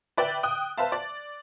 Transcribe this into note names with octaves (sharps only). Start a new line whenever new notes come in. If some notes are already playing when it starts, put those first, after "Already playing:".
B4 D5 E5 G5
G5 D#6 F#6
B4 C5 E5 F5 A5
D5